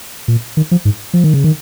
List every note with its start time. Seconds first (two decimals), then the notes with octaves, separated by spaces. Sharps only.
0.28 A#2
0.57 D#3
0.71 F3
0.85 G#2
1.13 F3
1.24 D#3
1.34 C#3
1.44 D#3